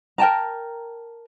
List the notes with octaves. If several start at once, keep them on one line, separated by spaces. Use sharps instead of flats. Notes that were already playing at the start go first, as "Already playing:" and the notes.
A#4 G5 A5 A#5